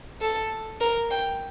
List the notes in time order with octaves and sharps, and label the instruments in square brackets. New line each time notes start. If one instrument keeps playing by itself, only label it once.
[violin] A4
A#4
G5